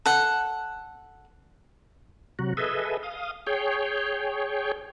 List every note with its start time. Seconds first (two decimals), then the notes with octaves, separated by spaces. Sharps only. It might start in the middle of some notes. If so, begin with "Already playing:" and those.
0.06 A4 F#5
2.39 C3 F#3 F#4
2.57 G#4 A4 B4 D#5 E5
3.03 F5 D#6
3.47 G#4 C#5 G5